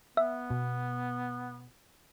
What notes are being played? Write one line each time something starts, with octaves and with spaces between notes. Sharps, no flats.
B3 E5
B2